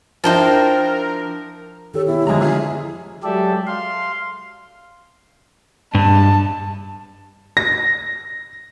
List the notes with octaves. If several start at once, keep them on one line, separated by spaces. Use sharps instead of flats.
F3 D4 E4 A#4 C5 G5 A5
D#3 G4 A4 C#5
B2 B3 E4 G#4
F2 A2 D3 F3 G#3 D#5 A#5
F4 G#4 E5 G#5
F#3 G#3 G4 A4 D5 E5
F5 C6
G2 A5
A#6